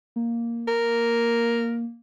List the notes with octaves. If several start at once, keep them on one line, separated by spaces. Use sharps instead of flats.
A#3
A#4